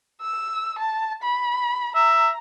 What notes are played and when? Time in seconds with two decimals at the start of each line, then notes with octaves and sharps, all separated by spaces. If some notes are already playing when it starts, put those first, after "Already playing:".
0.22 E6
0.79 A5
1.23 B5
1.96 E5 A#5